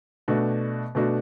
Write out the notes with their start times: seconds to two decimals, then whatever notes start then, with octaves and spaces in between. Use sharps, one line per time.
0.28 B2 A3 D4 F#4
0.95 B2 A3 D4 F#4